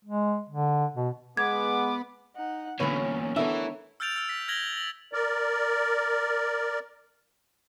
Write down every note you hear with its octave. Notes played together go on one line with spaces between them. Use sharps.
G#3
D3
B2
G#3 B3 D6 G#6
D#4 F#5
E2 A#2 D3 F#3 B3 C#4 B4 C#5
E3 A3 B3 D4 E4 A#4 C#5 E5
E6 F6 G6 A6 D7 F7
E6 F6
B6
F6 G#6 A#6 F#7 G7
A#6 F#7
A#4 D5